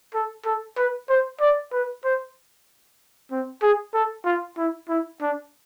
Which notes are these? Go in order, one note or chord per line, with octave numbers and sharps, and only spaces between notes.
A4
A4
B4
C5
D5
B4
C5
C4
G#4
A4
F4
E4
E4
D4